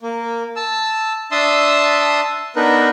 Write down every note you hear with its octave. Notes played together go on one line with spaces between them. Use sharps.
A#3
A5 E6
D4 E5 A5 C6 D#6 E6
B3 D4 D#4 A#4 B4